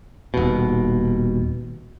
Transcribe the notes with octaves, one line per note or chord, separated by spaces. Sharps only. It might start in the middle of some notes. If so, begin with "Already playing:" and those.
D#1 B2